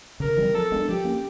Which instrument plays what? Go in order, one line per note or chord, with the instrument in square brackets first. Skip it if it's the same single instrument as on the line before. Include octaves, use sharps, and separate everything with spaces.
[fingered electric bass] C#3 [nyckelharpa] A#4
[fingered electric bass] E3 G3 C4
[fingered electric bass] F3 [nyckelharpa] A4
[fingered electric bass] G#3 B3 D4
[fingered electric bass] F3 [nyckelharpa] G4
[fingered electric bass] A#3 C#4